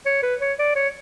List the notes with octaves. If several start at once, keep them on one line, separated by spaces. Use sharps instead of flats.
C#5
B4
C#5
D5
C#5